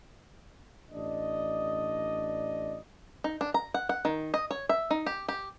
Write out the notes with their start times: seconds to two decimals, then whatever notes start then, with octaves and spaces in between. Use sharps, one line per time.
0.92 A1 D4 D5 D#5
3.24 D#4
3.41 D4
3.54 A#5
3.74 F#5
3.89 F#5
4.05 D#3
4.34 D#5
4.51 C#5
4.69 E5
4.91 D#4
5.06 G4
5.28 G4